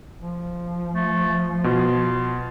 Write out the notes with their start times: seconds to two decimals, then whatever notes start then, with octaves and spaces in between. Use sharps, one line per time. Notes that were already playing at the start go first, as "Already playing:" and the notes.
0.20 F3
0.95 A3
1.64 B2 F4